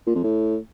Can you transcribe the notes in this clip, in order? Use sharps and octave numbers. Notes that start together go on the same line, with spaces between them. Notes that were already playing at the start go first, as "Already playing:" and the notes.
A#2
F2
A2